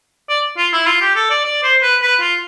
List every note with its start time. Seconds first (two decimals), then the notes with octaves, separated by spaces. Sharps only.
0.29 D5
0.57 F4
0.73 E4
0.86 F4
1.01 G4
1.15 A4
1.30 D5
1.45 D5
1.63 C5
1.82 B4
2.02 B4
2.21 F4